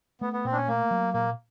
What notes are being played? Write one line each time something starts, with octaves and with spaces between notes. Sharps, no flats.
A3 B3
B3
A#2 C4
D4
C#4
A3 A#3
F#3
A#2 A#3